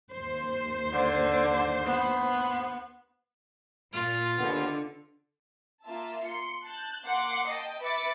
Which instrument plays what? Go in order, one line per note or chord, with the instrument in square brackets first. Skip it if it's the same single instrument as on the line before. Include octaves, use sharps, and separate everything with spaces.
[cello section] D#2 C5
[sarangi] D3
B3
[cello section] A#2 [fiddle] F4
[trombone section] D#2 B3 [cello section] D3
[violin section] A#3 F4 E5 A5
C6 C#7
A5 F#6 G6
A#3 F#5 C6 D6 C7
D#5 G5 A5
B4 E5 B5 D6 A6 C#7